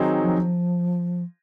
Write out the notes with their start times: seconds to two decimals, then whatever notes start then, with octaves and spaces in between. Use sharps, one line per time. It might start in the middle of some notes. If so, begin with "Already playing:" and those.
Already playing: D#3 F#3 C4 D#4 G#4
0.20 F3